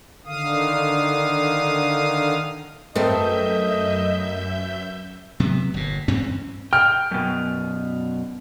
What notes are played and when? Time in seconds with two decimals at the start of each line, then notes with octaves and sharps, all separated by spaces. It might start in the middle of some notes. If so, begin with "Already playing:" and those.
0.26 D3 D#3 F5 D#6
2.96 F#2 A3 C4 A#4 B4 D#5 E5 G6
5.40 C3 F#3 B3
5.74 G1 A#2
6.08 G2 E3 C4 C#4
6.73 G5 F6
7.11 F#2 B2